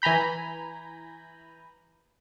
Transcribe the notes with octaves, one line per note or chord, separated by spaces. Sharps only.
E3 G#5 A#5 B5 G6